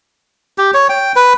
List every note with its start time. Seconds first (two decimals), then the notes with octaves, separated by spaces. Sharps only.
0.58 G4
0.74 C#5
0.89 G5
1.16 B4